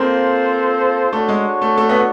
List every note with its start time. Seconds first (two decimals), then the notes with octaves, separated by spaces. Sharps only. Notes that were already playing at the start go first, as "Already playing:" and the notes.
Already playing: A#3 C4 F4 A4 C5
1.12 A3 D4 F#4 A4 C#5
1.29 G#3
1.61 A3
1.77 A3
1.89 B3